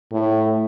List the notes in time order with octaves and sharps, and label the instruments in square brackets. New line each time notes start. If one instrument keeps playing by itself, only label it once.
[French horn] A2